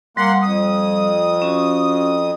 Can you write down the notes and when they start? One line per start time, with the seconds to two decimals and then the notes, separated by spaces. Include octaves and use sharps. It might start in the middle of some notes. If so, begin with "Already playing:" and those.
0.17 G3 A#3 F#5 C6
0.42 F2 D#6
1.42 C#4 F#4